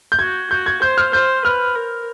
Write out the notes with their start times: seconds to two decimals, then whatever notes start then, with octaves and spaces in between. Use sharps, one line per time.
0.12 G6
0.19 F#4 G#6
0.50 F#4 G6
0.66 G#6
0.82 C5 G6
0.98 F6
1.13 C5 G6
1.45 B4 F6
1.76 A#4